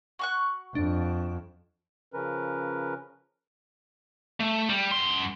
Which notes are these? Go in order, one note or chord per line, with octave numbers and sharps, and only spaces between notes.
F#4 C#6 F#6
F2 D4
C#3 F3 C#4 A#4 B4
A3
G3
F#2 C6